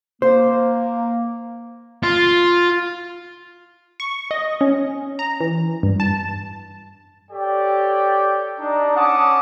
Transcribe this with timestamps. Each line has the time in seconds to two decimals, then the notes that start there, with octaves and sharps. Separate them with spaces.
0.22 A#3 C5
2.03 F4
4.00 C#6
4.31 D#5
4.61 C#4
5.19 A#5
5.41 E3
5.83 G2
6.00 A5
7.31 G4 A4 C#5 D5 G5
8.59 D4 D#4
8.96 C#4 F#5 A5 D6 D#6